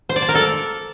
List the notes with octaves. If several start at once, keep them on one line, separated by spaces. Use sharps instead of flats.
C5
D5
A5
A#4
A4